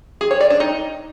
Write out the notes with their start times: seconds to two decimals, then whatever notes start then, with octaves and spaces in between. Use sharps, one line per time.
0.21 G#4
0.31 C#5
0.41 D5
0.50 D4
0.60 D#4